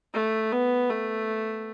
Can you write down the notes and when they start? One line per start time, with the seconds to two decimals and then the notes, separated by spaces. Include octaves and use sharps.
0.14 A3
0.52 B3
0.90 A3